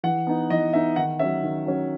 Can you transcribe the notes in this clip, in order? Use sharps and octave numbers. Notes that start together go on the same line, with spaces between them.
E3 F#5
B3 D#4
E3 D#5
B3 D#4 E5
D#3 F#5
F#3 C#4 E5
D#3
F#3 C#4